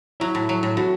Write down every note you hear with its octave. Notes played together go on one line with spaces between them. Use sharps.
F#3 E4
A2
F#3
A2
A2 F#4